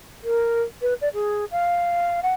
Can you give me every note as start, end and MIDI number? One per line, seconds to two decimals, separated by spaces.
0.23 0.62 70
0.81 0.94 71
1.01 1.09 74
1.13 1.45 68
1.51 2.20 77
2.22 2.34 78